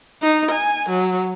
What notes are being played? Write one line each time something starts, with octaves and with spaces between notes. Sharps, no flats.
D#4
G#5
F#3